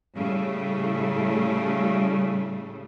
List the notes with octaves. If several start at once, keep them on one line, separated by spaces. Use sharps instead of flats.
A2 C#3 G3 A3